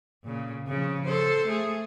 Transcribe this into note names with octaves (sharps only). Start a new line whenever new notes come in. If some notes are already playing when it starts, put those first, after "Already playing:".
A#2 C#3
C#3 F3
A4 C5
A3 G#4